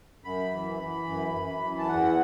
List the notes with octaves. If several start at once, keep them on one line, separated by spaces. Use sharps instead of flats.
F#2 B5
E3
E3
F#2
F#2
E3
A5
E2 F#5